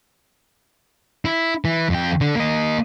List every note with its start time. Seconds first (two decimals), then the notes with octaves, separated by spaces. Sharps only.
1.25 E4
1.65 E3
1.90 F2 G5
2.21 D3
2.35 A#3 D#5